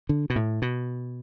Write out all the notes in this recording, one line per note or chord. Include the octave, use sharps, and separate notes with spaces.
D3
B2
A2
B2